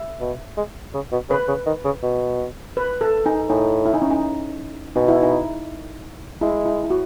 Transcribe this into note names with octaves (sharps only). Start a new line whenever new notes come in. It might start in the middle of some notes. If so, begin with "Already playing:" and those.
Already playing: E5
B2
G#3
C#3
B2
C#3 B4
C#3
D#3
C#3
B2
B4
A4
D#4
A2 D#4
E4
D#4
C#4
D#4
B2 D#4
E4
D#4
G#3 E4
E4
E4
F#4